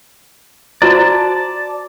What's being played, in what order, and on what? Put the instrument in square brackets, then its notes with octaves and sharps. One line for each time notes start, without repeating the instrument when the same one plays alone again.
[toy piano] F#4 C5 A#5 [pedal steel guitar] D5 A5